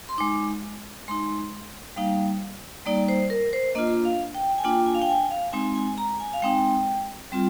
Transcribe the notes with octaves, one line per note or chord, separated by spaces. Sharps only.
C6
G#3 D#4 D6
G#3 D#4 C6
G3 A#3 D#4 F5
G3 A#3 D#4 D5
C5
A#4
C5
A#3 D4 F4 D#5
F5
G5
G#5
A#3 D4 F4 G5
G#5
F5
G5
G#5
F5
G#3 C4 D#4 G#5
G#5
A#5
G#5
F5
G#3 C4 D#4 G5
G3 C4 F4